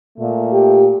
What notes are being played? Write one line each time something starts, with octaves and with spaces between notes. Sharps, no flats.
A#2 A3
G4